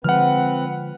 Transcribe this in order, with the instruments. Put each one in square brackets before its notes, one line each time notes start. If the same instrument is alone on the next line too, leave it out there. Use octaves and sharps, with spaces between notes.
[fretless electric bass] D3 F3 G#3 [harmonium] C4 B4 [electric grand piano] F#5 F6